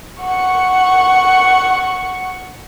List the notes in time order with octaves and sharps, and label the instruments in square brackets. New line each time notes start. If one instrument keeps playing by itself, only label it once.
[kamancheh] F#5 C#6